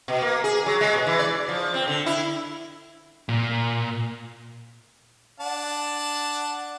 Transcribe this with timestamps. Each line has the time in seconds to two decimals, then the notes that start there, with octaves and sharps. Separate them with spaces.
0.08 B2
0.22 A#3
0.44 G#4
0.66 F#3
0.81 G#3
0.94 B2
1.07 E3
1.19 D5
1.49 F3
1.74 C4
1.87 D3
2.06 E4
3.29 A#2
5.40 D4 F#5 A5